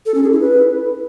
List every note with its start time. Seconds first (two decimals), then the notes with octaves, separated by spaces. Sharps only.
0.06 A4
0.15 C#4
0.23 G#4
0.32 E4
0.40 B4